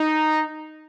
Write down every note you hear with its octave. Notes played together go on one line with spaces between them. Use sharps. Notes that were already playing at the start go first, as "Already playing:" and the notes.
Already playing: D#4